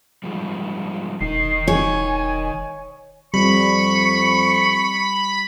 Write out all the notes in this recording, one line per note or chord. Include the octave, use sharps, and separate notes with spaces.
G#2 F3 G3
E1 D#3 D#4 C7
C#5 G#5
F2 G3 B5 C#6